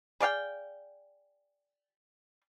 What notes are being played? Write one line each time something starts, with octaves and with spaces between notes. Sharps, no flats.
G#4 D5 F5 G5